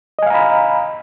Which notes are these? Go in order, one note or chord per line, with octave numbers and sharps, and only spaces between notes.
D#5 F5 G#5 A#5 B5